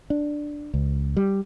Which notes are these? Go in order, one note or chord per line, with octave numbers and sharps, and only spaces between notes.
D4
C#2
G3